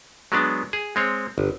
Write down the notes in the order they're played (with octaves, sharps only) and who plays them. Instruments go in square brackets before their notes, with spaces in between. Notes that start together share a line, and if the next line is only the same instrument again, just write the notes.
[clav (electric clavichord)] F#3 G#3 B3 D4
G#4
G#3 C4 C#5
G1